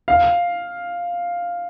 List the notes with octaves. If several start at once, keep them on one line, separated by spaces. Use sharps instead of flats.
F5